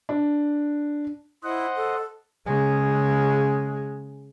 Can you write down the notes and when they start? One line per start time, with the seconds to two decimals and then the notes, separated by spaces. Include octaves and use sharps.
0.09 D4
1.43 E4 C5 D#5 F#5
1.76 A4
2.47 C#3 G#3